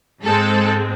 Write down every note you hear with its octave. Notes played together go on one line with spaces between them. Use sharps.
G#2 G#3 C4 A4